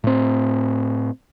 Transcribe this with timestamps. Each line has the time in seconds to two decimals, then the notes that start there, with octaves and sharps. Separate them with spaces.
0.04 A2 C4